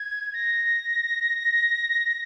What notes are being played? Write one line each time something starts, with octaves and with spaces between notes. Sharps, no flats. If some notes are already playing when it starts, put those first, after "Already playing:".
Already playing: G#6
A#6